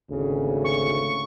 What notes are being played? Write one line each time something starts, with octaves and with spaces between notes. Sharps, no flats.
G#1 D2 C#3
C#6